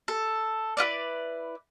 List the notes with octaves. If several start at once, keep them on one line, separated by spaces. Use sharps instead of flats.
A4
E4 F4 B4 D5